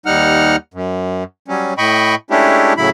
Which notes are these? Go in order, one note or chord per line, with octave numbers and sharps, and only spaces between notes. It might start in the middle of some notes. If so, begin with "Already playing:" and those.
D#2 G3 D#4 F#5 F6
F#2
F#3 G3 C#4
A2 D#5 G5 B5 C#6
G#3 A3 C#4 D4 E4 G4
A2 C#3 F#3 E4 B5